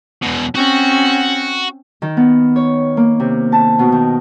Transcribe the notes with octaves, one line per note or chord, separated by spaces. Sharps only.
E2 B2
C4 C#4 F#4
D#3
B3
C#5
A#3
C3
A5
B2
D#3